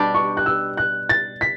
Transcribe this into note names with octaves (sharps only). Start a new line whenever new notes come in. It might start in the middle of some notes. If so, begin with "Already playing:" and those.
Already playing: B2 G3 D4 G4
C#6
F#6
E6
F#6
A6
B6